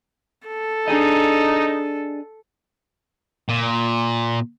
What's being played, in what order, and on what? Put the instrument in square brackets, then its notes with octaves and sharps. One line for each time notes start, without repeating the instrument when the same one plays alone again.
[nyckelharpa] A4
[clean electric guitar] D4 G#4 D#5 [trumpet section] D#4
[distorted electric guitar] A#2